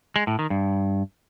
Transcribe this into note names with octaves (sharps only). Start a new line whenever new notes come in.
G#3
A2
D#3
G2